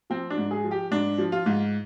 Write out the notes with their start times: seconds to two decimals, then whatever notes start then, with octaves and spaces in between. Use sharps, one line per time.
0.10 F3 C4
0.30 D4
0.38 G#2
0.51 G#4
0.64 F3
0.71 G4
0.91 G#2 D4
1.18 F3
1.32 F4
1.46 G#2